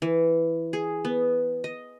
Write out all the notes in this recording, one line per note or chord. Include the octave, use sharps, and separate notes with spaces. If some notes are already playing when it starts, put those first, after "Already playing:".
E3
G#4
B3
D#5